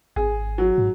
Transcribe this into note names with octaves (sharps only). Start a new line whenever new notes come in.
G#1 G#4
F#3
G#2